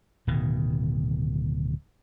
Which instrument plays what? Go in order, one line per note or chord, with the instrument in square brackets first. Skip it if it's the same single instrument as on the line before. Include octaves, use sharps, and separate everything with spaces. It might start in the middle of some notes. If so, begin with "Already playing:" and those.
[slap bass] D1 B2 D#3